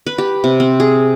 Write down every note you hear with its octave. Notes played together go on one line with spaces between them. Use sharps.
B4
G4
C3
C4
G#4